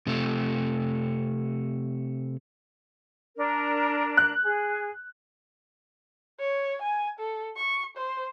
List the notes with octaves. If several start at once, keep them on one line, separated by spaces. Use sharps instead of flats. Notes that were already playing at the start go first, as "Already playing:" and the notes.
C3 A3
D4 A#4
F#6
G#4
C#5
G#5
A4
C#6
C5